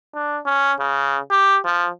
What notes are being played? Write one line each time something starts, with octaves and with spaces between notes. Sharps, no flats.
D4
C#4
C#3
G4
F3